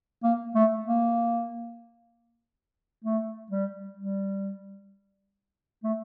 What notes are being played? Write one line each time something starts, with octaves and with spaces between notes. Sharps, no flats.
A#3
A3
A#3
A3
G3
G3
A3